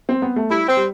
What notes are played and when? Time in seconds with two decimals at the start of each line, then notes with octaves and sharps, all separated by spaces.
0.09 C4
0.22 B3
0.36 A3
0.50 G3 E4
0.68 C4
0.77 G3